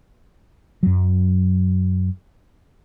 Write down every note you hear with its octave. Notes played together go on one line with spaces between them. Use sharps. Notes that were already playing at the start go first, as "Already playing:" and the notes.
F#2 F#3